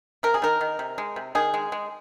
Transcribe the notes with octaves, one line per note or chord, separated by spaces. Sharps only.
C3 A#4
G#4
D#3 A#4
D#3
C3
G#3
C3
D#3 G#4
G#3
G#3